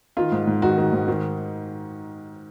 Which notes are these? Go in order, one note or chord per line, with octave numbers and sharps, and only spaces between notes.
D#3 F4
G#2
G#2
D#3 F#4
D#3
G#2
D#3